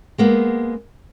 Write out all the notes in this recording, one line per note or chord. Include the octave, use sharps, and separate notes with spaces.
G#3 A#3 B3